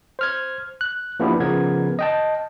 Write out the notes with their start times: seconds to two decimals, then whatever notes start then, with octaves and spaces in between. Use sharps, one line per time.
0.19 C5 F6 G#6
0.81 F#6
1.20 F3 A#3 B3 D4 E4 G4
1.40 C#3 F3 B3 A#4 G#6
1.99 D#5 G5 A5